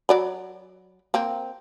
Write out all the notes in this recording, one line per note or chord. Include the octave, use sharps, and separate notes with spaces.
F#3 D5 B5
A#3 C4